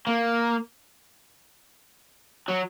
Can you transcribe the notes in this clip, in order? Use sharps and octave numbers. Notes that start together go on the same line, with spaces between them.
A#3
F#3